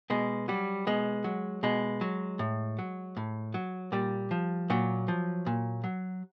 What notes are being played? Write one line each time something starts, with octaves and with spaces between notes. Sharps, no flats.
B2 G#3
F#3 G3
B2 G#3
F#3
B2 G#3
F#3
A2
F#3
A2
F#3
A#2 G3
F3
A#2 F#3
F3
A#2
F#3